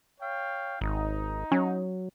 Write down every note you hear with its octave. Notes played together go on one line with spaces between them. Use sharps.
C#5 F5 G5
G#1 D#4
F#3 C#4